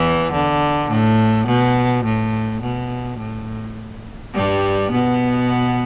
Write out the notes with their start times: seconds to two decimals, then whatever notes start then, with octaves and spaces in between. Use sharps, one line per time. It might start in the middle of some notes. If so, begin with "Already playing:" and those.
Already playing: E2 E3
0.33 D3
0.90 A2
1.47 B2
2.05 A2
2.62 B2
3.19 A2
4.34 G2 G3
4.91 B2 B3